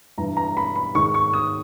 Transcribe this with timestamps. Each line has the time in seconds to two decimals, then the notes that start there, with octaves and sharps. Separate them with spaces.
0.18 G2 E3 A#5
0.37 A#5
0.57 B5
0.76 B5
0.95 G#2 D#3 C#6
1.14 C#6
1.33 D#6